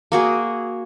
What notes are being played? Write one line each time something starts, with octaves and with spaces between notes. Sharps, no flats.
A#3 F#4 G#4